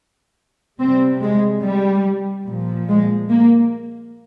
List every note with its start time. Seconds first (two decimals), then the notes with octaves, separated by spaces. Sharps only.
0.80 C3 G3 C4
1.22 G#3
1.62 G3
2.47 A#2 F3
2.88 G#3
3.30 A#3